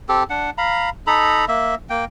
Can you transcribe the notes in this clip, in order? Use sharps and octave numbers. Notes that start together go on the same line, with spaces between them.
C4 G4 A4
D4 F#5
F5 A#5 B5
D#4 A4 A#5 B5
A#3 E5
A#3 G5